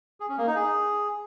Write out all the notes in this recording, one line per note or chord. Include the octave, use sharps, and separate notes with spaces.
G#4
C#4
A#3
D#4
G#4